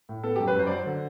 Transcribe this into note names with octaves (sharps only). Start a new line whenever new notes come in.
A2
B3 A4
F#2 G4
B4
F#2 C5
D5
F#3 C5
D3